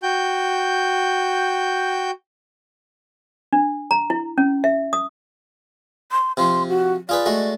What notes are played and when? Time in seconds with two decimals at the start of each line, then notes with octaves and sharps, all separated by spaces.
0.03 F#4 G5 G6
3.53 D4
3.91 A#5
4.10 E4
4.38 C#4
4.64 E5
4.93 D#6
6.12 C6
6.37 C3 F3 C6
6.69 F#4
7.09 F4 G#4 B4 D5
7.26 G#3 A3 F#4